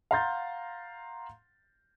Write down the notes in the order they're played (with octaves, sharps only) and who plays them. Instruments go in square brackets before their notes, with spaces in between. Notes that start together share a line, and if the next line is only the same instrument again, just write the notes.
[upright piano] F5 F#5 A#5 C6 G6 A6